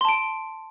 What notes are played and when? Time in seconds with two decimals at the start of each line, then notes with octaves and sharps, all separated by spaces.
0.01 C6
0.05 A5
0.09 D7